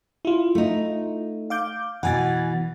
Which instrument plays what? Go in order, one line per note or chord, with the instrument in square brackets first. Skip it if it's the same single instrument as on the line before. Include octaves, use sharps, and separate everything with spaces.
[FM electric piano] E4 F4
[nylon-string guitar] A3 D#4
[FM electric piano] F5 D6 G6
[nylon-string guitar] B2 E3 [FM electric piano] F#5 G#5 A6